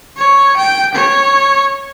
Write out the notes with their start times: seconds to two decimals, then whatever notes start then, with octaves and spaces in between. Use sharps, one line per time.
0.17 C#5
0.57 G5
0.95 C#5